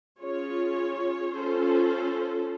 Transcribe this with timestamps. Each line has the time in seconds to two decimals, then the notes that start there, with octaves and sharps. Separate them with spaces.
0.19 C#4 F4 G#4 C#5
1.32 C#4 F4 A4 C5